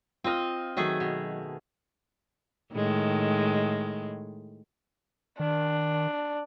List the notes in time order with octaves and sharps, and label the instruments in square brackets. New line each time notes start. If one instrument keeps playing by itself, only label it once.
[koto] C4 D#5 [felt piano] F4 F6
[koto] D#3 A3 G#4 [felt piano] F#3
[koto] B2
[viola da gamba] A2 D#3 G#3
[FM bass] D#3 [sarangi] D4